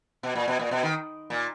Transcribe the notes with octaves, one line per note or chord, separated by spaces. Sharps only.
B2
A#2
B2
A#2
B2
D#3
A#2